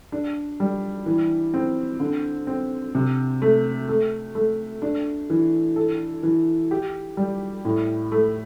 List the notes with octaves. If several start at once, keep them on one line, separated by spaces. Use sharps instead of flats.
D4
G3
E3
C4
D3
C4
C3
A3
A3
A3
D4
E3
A4
E3
G4
G3
A2
A3